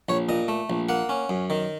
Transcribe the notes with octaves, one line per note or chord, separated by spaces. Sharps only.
A#1 C#5
A#2 D#5
A3
A#1
A#3 F#5
C#4
F#2
D#3